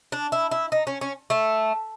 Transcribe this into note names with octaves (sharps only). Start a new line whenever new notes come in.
D4
E4
E4
D#4
C#4
C#4
A3